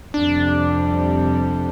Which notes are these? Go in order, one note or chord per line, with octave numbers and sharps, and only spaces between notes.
F2 C3 G3 D4